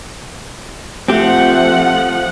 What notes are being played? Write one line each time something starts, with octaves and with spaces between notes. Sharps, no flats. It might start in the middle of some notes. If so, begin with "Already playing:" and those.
F3 A3 C4 G4 F#5